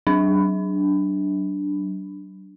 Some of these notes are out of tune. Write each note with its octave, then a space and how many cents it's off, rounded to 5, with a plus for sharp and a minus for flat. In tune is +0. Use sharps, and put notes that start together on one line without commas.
F#3 +40 D4 +0